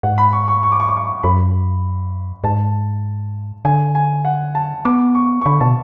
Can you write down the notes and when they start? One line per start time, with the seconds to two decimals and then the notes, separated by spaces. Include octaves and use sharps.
0.03 G#2 F#5
0.18 B5
0.33 C#6
0.48 C#6
0.63 C#6
0.72 D6
0.80 C#6
0.88 D6
0.97 C#6
1.23 F#2 B5
2.44 G#2 A5
3.65 D3 G#5
3.95 G#5
4.25 F#5
4.55 A5
4.85 B3 D6
5.15 C#6
5.41 C#6
5.45 D3 B5
5.60 B2 A5